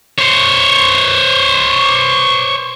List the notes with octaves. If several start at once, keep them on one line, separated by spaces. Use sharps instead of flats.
C5 C#5